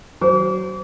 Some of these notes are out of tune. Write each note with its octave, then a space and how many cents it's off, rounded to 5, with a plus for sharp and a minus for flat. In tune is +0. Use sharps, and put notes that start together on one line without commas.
F#3 +20 C5 -20 D6 -40